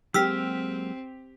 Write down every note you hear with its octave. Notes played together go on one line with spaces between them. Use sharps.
F#3 G#3 A#3 C4 G4 E6 F6 B6